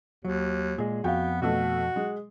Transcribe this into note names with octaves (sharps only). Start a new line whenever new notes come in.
D#2 F#3
A#2 G#3 G#4
F2 B3 F#4 F5 G5
B2 A3 F#4
G#3